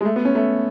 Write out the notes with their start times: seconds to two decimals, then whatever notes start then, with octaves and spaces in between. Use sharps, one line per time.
0.01 G#3
0.05 A3
0.16 B3
0.25 C#4
0.35 A3